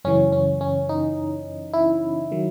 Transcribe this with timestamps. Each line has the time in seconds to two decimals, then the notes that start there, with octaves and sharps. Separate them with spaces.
0.04 F#2 C#3 E3 C#4
0.32 C#4
0.61 C#4
0.89 D#4
1.73 E4
2.32 D#3 F#3